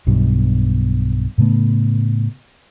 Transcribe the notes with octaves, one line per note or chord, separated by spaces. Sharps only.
B1 G2 B2
A2 C#3 A3 B3